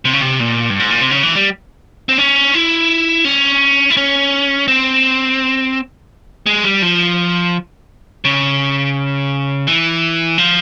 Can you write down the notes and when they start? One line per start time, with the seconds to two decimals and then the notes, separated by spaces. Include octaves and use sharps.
0.05 C3
0.13 C#3
0.21 C3
0.40 A#2
0.70 G2
0.80 G#2
0.91 A#2
1.01 C3
1.11 C#3
1.23 E3
1.35 G3
2.09 C4
2.18 C#4
2.54 E4
3.25 C#4
3.90 E4
3.97 C#4
4.68 C4
6.46 G#3
6.64 G3
6.82 F3
8.25 C#3
9.67 E3
10.38 F3